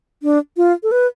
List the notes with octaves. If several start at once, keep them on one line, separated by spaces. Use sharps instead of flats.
D4
F4
A4
B4